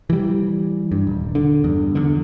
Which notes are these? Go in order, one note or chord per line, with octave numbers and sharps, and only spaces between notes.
E3 G3
G2
D#1
D3
E2 G2
E2 D3